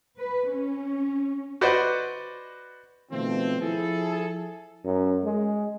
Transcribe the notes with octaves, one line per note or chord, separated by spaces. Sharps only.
B4
C#4
F#4 B4 C5 D5 D#5 F#5
B2 D#3 F3 A3 C4
F3 E4 G#4 A4
F#2
G#3